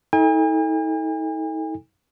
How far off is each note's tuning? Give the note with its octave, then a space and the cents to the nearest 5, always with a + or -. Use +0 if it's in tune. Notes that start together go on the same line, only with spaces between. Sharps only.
D#4 +45 A4 +0 G#5 -45